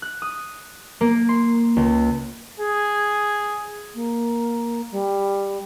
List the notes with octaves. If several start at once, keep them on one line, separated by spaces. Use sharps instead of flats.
F#6
D#6
A#3
C6
C#2
G#4
A#3
G3